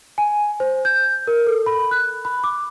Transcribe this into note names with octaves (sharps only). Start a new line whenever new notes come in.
G#5
C5
G6
A#4
A4
B5
F#6
B5
D6